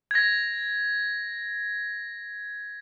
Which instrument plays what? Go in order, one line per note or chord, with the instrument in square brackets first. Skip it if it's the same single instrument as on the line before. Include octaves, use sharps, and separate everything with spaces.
[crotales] G#6 A#6